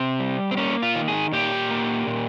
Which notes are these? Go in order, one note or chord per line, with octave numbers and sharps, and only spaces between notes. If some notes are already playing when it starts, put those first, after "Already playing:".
Already playing: C3 C4
G3
C4
A#3 C#4
F4
D#3
G#4
A#2 G4
A#3
A#2